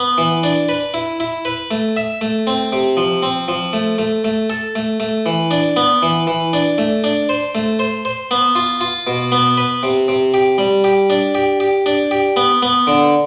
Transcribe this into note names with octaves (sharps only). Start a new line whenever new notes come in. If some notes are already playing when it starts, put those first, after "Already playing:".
Already playing: B3
E3
D4
B4
E4
E4
B4
A3
E5
A3
C4
C3
F3
C4
F3
A3
A3
A3
A4
A3
A3
E3
D4
B3
E3
E3
D4
A3
D4
C5
A3
C5
C5
B3
F4
F4
B2
B3
B4
C3
C3
G4
G3
G4
D4
G4
G4
D4
G4
B3
B3
D3